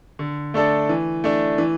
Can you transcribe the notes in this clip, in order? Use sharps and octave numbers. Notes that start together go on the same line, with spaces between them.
D3
A3 D4 A4 D5
E3
A3 D4
E3